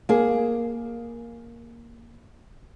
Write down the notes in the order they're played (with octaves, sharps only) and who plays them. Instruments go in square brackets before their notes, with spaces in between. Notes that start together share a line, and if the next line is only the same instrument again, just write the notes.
[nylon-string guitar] A#3 G#4